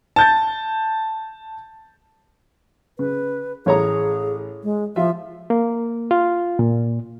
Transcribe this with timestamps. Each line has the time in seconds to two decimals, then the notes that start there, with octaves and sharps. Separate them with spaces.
0.16 A5 G6 A6
2.99 C#3 B4
3.66 A1 G#4 C#5 A#5
4.64 G#3
4.96 F3 F4 E5
5.50 A#3
6.11 F4
6.59 A#2